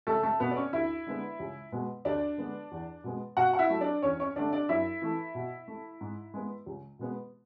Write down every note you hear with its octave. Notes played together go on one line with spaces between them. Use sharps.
C#2 A3 A4
A3 A4
B2 A3 B3 B4
D5
C#4 C#5
D2 E4 E5
D3 G#3 B3
C#2
B2 G#3 B3
D2 D4 D5
D3 G#3 B3
E2
B2 G#3 B3
B2 F#4 F#5
F#5
E4 E5
F#3 A3
D4 D5
E2 C#4 C#5
C#4 C#5
D3 A3 D4 D5
D4 D5
F#2 E4 E5
E3 A3
B2
A3
G#2
G#3 B3
C#2
B2 G#3 B3